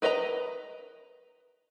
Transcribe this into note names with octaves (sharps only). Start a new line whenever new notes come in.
A#4 B4 D#5 F5 A#5